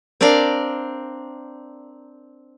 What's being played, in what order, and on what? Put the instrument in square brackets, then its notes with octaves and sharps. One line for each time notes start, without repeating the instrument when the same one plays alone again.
[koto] C4 D4 A#4 D5 F5